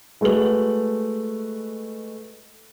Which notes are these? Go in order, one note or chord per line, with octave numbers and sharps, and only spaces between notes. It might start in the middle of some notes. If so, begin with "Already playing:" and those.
G#3 A3 F#4 B4 F#7